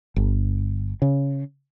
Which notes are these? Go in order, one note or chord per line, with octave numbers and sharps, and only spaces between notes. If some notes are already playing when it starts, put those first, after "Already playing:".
G1
C#3